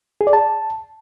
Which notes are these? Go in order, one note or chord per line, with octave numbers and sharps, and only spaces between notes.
G#4
D5
A5